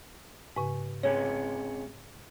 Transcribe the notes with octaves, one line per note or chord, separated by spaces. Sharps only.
G#2 C#3
C3 G#3 C#4 C#5